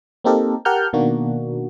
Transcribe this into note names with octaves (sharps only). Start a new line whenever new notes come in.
A#3 C4 D#4 G4 A4 A#4
G4 A#4 F#5 A5 F6 G6
B2 D#3 A#3 D4 F#4